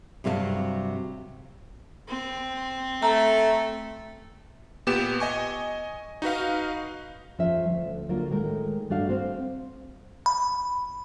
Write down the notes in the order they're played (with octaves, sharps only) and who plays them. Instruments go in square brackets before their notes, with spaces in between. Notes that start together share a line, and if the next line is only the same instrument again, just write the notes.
[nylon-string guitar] G2 C3 F#3 A4 F5 A5
[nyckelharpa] C4
[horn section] A3 [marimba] A#5
[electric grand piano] A#2 B3 G4 E7
D#5 G#5 C#6
D#4 F#4 B4 F5
[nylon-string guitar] F2 F3 C#4 E5
D2
D3 F#3 A#3 F4 A#4
A2 D#3 G#3 A3 A#4
G2 A3 D4 F#4 F5
C4 C5 F5
[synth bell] B5